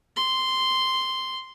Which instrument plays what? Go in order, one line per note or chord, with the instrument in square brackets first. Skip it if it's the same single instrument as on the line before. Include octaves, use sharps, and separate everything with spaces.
[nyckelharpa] C6